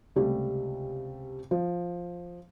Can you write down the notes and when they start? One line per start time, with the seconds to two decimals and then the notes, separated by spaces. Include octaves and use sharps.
0.16 C#2 C3 G3 A3
1.51 F3